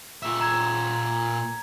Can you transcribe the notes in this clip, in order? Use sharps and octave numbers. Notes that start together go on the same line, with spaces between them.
A#2 E5
A#5 G#6